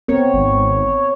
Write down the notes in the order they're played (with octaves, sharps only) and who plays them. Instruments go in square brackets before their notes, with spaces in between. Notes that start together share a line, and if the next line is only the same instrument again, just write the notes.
[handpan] B3 C4 A#4 [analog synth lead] C#5
[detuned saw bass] G#1